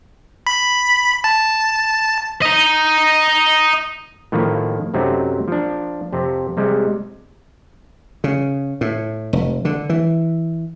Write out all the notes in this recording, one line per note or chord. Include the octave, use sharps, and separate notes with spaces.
B5
A5
D#5 A#5
A2 D#3 F3 A#3
F#2 C3 F#3 A3 C4 D#4
F3 D4
F2 C3 C4
C3 G3 G#3
C#3
A2
F1
D3
E3